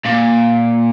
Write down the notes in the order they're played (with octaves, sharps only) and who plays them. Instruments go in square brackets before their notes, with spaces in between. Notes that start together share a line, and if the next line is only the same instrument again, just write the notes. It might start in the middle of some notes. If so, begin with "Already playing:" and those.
[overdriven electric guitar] A#2